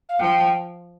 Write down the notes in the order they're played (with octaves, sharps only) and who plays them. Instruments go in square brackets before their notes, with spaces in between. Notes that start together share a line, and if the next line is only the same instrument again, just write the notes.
[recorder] F5
[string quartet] F3 [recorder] G5